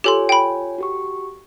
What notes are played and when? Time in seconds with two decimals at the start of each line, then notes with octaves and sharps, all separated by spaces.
0.04 F4 G4 A4 C#5 G#5 C6
0.29 G5 B5
0.78 F#4 G4 C#6